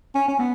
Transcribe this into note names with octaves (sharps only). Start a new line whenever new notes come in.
C#4
C#4
B3